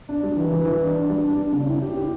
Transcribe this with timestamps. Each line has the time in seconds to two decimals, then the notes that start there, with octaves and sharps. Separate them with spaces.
0.09 D4
0.23 G3
0.37 E3
0.52 E3
0.66 E3
0.81 D4
0.95 D4
1.10 G3
1.24 D4
1.38 D4
1.53 C#3
1.68 E4
1.82 G4
1.97 G4